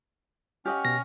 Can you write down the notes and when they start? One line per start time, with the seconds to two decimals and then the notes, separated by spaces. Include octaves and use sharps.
0.65 C#4 G4 D#5 F#5 F6
0.85 B2 A#6